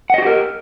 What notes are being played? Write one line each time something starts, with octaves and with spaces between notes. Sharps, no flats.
F#4 G4 A#4 D#5 F#5